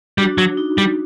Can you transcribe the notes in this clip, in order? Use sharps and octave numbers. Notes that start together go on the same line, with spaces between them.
G3 D4 F#4
F#3
D#4
G3